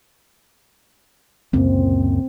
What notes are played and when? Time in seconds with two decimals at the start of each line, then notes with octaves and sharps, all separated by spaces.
1.53 C#2 F#2 A#2 C4